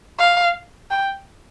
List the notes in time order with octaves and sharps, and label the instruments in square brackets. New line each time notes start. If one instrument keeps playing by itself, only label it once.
[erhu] F5
G5